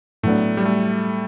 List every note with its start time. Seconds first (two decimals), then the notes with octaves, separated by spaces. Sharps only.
0.23 A2 F#3 A3 B3 D4
0.57 G3
0.65 A3